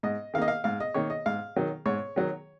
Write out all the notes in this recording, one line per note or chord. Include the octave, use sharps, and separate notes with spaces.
G#2 D#5
D#3 A#3 D#5 F5
F5
G#2 F5
D#5
D#3 A#3 C#5
D#5
G#2 F5
D#3 F#3
G#2 C#5
D#3 F#3